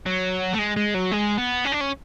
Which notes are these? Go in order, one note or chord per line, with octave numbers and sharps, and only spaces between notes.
F#3
A3
G#3
G#3
F#3
G#3
B3
C#4
D4
C#4